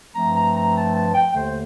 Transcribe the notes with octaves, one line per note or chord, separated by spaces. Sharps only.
G2 F3 A3 C4 A#5
A#5
A#5
A5
A5
G5
D#2 D3 A3 C5